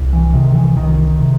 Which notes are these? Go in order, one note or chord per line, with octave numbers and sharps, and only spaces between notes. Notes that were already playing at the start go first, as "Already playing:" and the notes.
Already playing: C2
E3
C3 D#3
E3
C2 D#3
C3